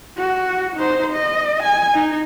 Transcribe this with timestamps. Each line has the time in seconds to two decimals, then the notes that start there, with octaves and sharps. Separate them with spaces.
0.17 F#4
0.76 D#4 C5
1.13 D#5
1.63 G#5
1.94 D#4